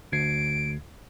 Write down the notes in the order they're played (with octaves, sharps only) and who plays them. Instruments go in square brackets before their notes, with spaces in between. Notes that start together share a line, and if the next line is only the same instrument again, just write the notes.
[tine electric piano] D2 G#6 C7 [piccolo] D7